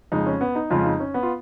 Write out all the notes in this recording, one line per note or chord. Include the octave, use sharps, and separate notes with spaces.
F2 C#3 G#3 D#4
C#4
B3
D#4
F2 C#3 G#3 F4
D#4
C#4
B3
F4